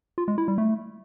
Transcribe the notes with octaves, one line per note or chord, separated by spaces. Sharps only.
F4
G#3
E4
G3
A3